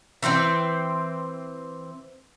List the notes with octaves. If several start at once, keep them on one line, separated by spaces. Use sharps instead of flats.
E3 C4 C5 G5